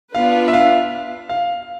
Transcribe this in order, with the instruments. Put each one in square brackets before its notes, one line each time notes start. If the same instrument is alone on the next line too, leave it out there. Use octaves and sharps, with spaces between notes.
[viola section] B3 D4 F4 B4 [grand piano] F5
[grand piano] E5
F5
F5